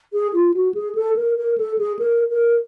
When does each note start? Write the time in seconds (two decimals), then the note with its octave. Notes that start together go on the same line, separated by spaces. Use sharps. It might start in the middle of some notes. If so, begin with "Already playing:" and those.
0.13 G#4
0.33 F4
0.54 F#4
0.74 G#4
0.95 A4
1.16 A#4
1.37 A#4
1.58 A4
1.78 G#4
1.99 A#4
2.30 A#4